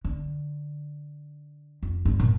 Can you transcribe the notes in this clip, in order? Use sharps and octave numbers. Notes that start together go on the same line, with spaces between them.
D3
F2
G2
A#2